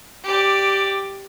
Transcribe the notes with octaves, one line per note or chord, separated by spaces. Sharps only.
G4 D5